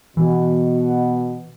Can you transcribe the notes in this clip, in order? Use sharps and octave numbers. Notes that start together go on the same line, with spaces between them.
B2 E3